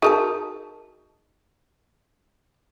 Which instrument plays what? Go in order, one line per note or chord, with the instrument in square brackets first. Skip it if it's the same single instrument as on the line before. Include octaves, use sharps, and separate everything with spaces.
[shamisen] D#4 A#4 A5 [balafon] F#4 G#4